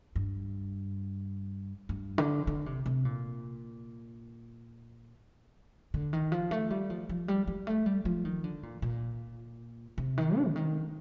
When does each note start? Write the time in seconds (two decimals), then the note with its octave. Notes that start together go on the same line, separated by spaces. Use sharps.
0.16 G2
1.89 G2
2.18 D3
2.47 D3
2.66 C3
2.86 C3
3.05 A#2
5.94 D3
6.13 D#3
6.32 F3
6.51 A3
6.70 G3
6.90 F3
7.09 F3
7.28 G3
7.47 G3
7.67 A3
7.86 G3
8.05 F3
8.25 D#3
8.44 D3
8.63 A#2
8.82 A#2
9.98 C3
10.18 D#3
10.37 D4
10.48 D3
10.56 D#3